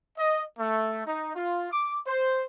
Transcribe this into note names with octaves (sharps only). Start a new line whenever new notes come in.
D#5
A3
D#4
F4
D6
C5